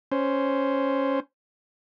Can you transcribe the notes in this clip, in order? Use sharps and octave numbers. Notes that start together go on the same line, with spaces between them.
C#4 C5